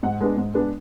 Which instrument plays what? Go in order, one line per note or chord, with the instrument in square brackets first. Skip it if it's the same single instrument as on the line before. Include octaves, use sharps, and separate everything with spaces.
[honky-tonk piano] G#2 F#5
G#3 B3 D4
G#2
G#3 B3 D4